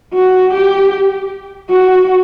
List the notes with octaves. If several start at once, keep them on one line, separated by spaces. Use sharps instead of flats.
F#4
G4
F#4